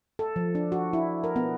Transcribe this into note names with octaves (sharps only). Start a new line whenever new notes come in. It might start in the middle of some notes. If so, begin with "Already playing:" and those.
A4
F3
D4
F#4
E4
A#4
B3